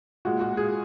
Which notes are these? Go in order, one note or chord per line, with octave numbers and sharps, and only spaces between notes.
A#2 G#3 F#4
F#4
G#4